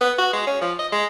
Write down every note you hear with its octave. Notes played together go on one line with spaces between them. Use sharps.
B3
F#4
G#3
C#4
F3
D#5
G#3